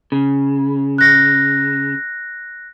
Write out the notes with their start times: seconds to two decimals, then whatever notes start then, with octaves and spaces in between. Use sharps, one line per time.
0.12 C#3
0.98 F#6 A#6